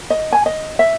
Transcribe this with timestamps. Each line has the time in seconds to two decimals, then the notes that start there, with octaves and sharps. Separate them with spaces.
0.10 D#5
0.32 G#5
0.46 D#5
0.79 E5